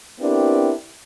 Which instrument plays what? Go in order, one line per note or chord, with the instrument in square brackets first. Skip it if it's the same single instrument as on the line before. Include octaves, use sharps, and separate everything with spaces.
[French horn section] B3 C4 D4 E4 G4 A#4